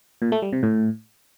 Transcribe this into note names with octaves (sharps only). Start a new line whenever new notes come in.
A#2
A3
G3
C3
A2